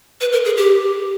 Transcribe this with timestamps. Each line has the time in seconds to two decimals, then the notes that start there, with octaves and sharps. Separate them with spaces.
0.21 B4
0.32 A#4
0.45 G#4
0.57 G4